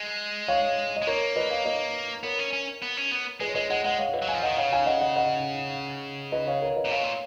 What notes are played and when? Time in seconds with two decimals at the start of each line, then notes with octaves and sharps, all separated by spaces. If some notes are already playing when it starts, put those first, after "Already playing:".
Already playing: G#3
0.48 C#5 F5
0.96 D#5
1.02 G#3
1.07 A#3 A#4 C#5
1.36 B4 D#5
1.51 C#5 F5
1.65 B4 D#5
2.23 B3 A#4 C#5
2.39 C#4
2.53 C#4
2.82 B3
2.97 C#4
3.11 B3
3.40 G#3 G#4 B4
3.48 C#5
3.55 G#3 B4 D#5
3.70 G#3 D#5 F#5
3.84 G#3 D#5 F#5
3.99 C#5 F5
4.14 B4 D#5
4.22 F#3
4.28 F5 G#5
4.34 F3
4.43 D#3 D#5 F#5
4.57 C#3 C#5 F5
4.72 F5 G#5
4.86 D#5 F#5
5.01 D#5 F#5
5.16 D#5 F#5
6.32 B4 D#5
6.47 C#5 F5
6.62 A#4 C#5
6.77 B4 D#5
6.85 A#2
6.91 B2 C#5 F5
7.04 A#2